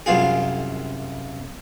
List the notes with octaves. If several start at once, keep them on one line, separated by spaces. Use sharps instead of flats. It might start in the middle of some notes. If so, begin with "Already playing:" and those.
C2 F#2 F4 G#4